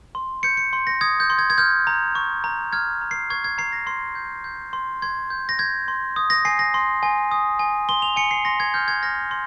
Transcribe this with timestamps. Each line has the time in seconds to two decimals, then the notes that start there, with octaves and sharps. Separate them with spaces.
0.15 C6
0.43 G6 C#7
0.57 C#7
0.73 C6
0.87 A#6
1.01 D#6 G#6
1.20 G6
1.30 C6
1.39 G#6
1.50 G#6
1.58 F6 G6
1.87 A#5
2.15 C#6
2.44 A#5
2.72 F6 G#6
3.01 A#5
3.11 C7
3.30 C#6 G#6
3.44 G#6
3.58 A#5 C7
3.73 A#6
3.87 C6 C7
4.15 G6
4.44 G6
4.73 C6
5.02 C6 G#6
5.30 G6
5.49 A#6
5.59 G6 G#6
5.88 C6
6.16 D#6
6.30 A#6
6.45 G#5 C7
6.59 A#6
6.74 C6
7.03 G#5
7.31 D#6
7.59 G#5
7.89 C6 G7
8.02 F7
8.16 G#5 C#7
8.31 C7
8.45 C6 A#6
8.60 G#6
8.74 F6 G6
8.88 G#6
9.02 F6 A#6
9.31 C6